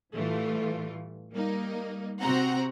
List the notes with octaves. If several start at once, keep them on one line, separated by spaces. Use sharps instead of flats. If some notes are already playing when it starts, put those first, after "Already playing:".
A2 E3 G3 A3 F4
G3 A#3 D#4
C3 C4 F#4 C5 F#5 A#5